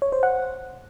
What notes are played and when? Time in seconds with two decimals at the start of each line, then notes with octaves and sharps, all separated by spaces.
0.02 C#5
0.12 C5
0.23 F#5